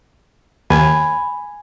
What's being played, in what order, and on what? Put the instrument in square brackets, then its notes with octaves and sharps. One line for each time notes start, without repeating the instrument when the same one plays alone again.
[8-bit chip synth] D#2 [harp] G#5 [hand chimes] B5